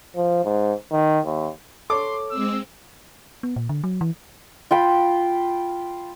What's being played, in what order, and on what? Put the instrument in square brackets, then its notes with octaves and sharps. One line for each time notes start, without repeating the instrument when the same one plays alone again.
[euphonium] F3
G#2
D#3
D#2
[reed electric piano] A4 C#5 [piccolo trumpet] C6 [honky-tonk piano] D6
[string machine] G#3 C4 [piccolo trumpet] E6
[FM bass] B3
A#2
D3
F#3
E3
[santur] F4 G5 B5